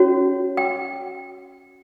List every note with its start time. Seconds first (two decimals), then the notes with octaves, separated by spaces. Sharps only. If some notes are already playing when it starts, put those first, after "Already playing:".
Already playing: C#4 F#4 C#5
0.57 G5